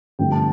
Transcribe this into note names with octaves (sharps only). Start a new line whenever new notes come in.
G2 D3 F3 A3 C4 G5
A5